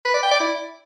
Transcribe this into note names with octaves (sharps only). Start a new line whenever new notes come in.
B4
D5
G5
D5
E4